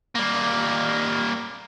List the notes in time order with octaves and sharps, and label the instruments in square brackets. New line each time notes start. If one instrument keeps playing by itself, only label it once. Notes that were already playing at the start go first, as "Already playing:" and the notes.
[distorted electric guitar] G3 A#3